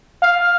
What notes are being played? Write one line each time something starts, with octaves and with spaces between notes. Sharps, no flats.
F5